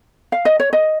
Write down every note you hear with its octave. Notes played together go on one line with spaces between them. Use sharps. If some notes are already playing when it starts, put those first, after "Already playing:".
F5
D#5
C#5
D#5